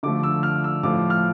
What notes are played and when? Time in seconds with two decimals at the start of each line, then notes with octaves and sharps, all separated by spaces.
0.03 D3 F3 A3 D6
0.23 E6
0.43 F6
0.64 E6
0.83 A2 F3 A3 D6
1.10 F6